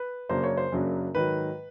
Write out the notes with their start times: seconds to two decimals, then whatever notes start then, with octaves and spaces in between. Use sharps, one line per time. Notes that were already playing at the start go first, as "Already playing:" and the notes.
Already playing: B4
0.29 F#2 C#3 F#3 A#3 D4 C5
0.43 C#5
0.57 C5
0.72 F#2 C#3 F#3 A#3 D4
1.14 G#2 D#3 F#3 B4